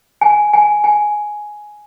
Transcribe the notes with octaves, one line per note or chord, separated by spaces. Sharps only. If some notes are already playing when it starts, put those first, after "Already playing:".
G#5
G#5
G#5